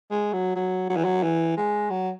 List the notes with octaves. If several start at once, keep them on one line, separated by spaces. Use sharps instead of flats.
G#3
F#3
F#3
F#3
E3
F#3
E3
G#3
F#3